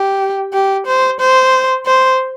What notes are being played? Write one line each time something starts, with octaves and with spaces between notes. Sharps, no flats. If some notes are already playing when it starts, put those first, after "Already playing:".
Already playing: G4
G4
C5
C5
C5